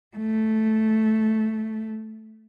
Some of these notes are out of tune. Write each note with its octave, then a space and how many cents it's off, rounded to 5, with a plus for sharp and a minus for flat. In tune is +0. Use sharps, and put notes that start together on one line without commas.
A3 -5